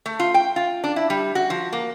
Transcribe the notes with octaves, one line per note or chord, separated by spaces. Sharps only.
A3
F4
G5
F4
D4
E4
G3
F#4
F3
A#3